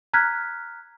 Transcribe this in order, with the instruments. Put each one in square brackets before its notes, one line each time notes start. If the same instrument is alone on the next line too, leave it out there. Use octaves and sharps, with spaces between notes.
[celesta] A#5 F6 F#6 G#6 B6